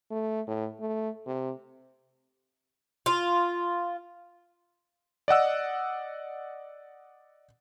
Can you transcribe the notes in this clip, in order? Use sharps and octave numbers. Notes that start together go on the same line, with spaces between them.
A3
A2
A3
C3
F4
D5 D#5 F#5 E6